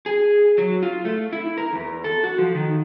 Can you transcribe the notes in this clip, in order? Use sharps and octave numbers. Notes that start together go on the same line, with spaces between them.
G#4
F#3
F4
A3
E4
A#4
E2
A4
F#4
F3
D#3